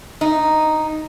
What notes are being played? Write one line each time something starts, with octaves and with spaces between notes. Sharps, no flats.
D#4